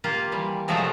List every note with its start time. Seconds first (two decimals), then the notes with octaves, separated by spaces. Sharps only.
0.04 A#3 F4 G4
0.32 E3 G3
0.68 C3 F3 F#3 G#3 A3 A4